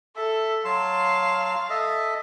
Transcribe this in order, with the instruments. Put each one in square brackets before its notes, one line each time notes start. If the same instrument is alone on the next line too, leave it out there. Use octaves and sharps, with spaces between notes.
[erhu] A4 [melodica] E5
[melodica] F#3 A5 C6 [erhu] F5
[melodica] A4 D#5 E5